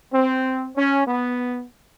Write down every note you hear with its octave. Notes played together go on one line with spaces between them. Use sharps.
C4
C#4
B3